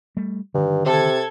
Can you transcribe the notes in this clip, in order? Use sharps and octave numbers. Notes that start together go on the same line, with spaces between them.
G3 A3
G2 D3 D#3
C3 A4 G#6